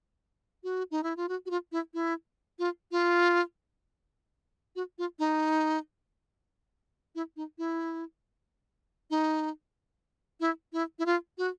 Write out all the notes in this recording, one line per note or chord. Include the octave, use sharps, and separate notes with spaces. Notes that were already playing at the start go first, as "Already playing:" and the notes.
F#4
D#4
E4
F4
F#4
F#4
F4
E4
E4
F4
F4
F#4
F4
D#4
E4
D#4
E4
D#4
E4
E4
E4
F4
F#4